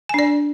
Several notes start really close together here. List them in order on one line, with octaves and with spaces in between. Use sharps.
G#5 D4 D5